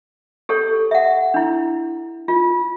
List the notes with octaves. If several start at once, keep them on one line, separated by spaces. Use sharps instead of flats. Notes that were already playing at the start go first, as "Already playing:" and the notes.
G4 A4 C#5
E5 F#5
D4 E4
F4